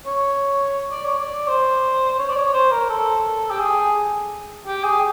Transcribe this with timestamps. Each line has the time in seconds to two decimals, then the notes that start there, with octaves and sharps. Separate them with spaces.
0.06 C#5
0.91 D5
1.05 C#5
1.18 D5
1.48 C5
2.19 C#5
2.29 D5
2.36 C#5
2.54 C5
2.72 A#4
2.89 A4
3.51 G4
3.60 G#4
4.67 G4
4.84 G#4